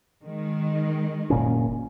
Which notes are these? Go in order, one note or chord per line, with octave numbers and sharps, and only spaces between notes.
D#3 G#3
F#1 A#2 C#4